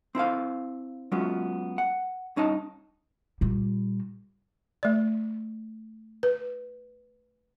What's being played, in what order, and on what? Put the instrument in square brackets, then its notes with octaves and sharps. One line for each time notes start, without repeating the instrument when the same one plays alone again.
[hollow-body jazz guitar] C4 E4 C5 F5
F#3 G#3 B3 C#4 F4
F#5
G2 C#4 D#4 D#5 A5
[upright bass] A#2 G3
[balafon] A3 D5
B4